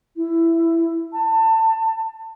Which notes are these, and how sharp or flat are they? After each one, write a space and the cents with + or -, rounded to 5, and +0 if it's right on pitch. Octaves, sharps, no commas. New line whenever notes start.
E4 +10
A5 +25